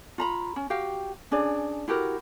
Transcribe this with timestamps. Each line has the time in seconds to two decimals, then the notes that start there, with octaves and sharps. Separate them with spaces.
0.18 F4 A#5 B5
0.56 C#4
0.70 F#4 G4 F5 G5
1.31 C#4 D4 G#4 D5
1.88 E4 F#4 G4 A#4